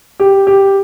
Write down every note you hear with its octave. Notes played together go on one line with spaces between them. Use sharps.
G4
G4